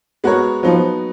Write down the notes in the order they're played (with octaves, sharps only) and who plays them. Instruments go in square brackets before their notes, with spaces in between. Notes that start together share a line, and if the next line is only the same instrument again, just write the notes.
[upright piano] G#3 B3 F#4 A#4 C#5
[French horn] F3 [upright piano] F#3 B3 D#4